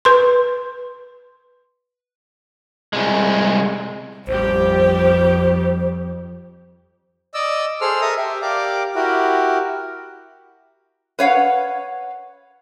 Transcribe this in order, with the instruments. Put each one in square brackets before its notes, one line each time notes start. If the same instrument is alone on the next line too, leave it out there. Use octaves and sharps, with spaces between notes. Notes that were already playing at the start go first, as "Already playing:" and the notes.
[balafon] B4 C6
[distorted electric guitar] C2 G#3
[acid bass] A1 [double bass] F2 [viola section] G3 G4 [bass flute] C5
[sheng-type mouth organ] D5 D#5 E6
G#4 A4 C5 E6 F6
A4 A#4 E5 A#5 D#6
G4 E5
G4 A#4 D5 F5 D6
E4 F#4 G4 A#4
[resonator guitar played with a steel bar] B4 C#5 F5 F#5